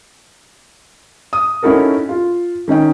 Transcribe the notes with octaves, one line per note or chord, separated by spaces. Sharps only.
D#6
C#4 D#4 E4 F#4 A4 A#4
F4
D#3 C#4 D#5 G5